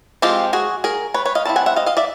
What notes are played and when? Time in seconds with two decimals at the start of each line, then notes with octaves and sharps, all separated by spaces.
0.22 F3 G#3 C4 F4 G4
0.53 F#4 G#4
0.84 G#4 A#4
1.14 B4 C#5
1.25 B4 C#5
1.35 D#5 F5
1.45 G3 C4 E4 A5
1.56 F#5 G#5
1.66 E5 F#5
1.76 D#5 F5
1.86 D#5 F5
1.97 D5 E5